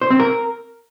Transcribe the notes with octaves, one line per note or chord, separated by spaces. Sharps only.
C5
C4
A#4